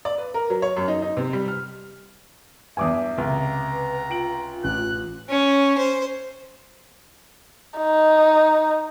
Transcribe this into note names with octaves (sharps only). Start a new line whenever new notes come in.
D5
B4
A#4
F#3
C#5
F#2
D#4
D#4
C3
G3
F6
E2 G2 E5 G#5 D6 D#6
C#2 C3 A#5
B4
F4 G5 D7 F#7
A1 F#6
C#4
C5
D#4